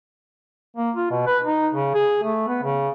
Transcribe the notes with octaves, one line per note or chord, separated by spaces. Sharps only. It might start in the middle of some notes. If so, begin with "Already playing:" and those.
A#3
F4
B2
B4
D#4
C#3
G#4
A3
B3
C#3